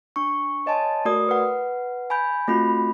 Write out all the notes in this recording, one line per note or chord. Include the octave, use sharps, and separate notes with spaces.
D4 C#6
C#5 D#5 G#5 A5 C6
A3 F#4 A#4 D5 D#6
B4 F#5
G#5 B5 G6
A3 C4 F4 F#4 B5